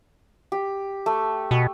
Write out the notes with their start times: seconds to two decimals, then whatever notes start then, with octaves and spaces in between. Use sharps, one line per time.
0.52 G4
1.06 A3
1.51 B2